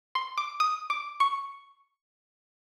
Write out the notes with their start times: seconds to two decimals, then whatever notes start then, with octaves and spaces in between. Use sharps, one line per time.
0.15 C6
0.38 D6
0.60 D#6
0.90 D6
1.20 C#6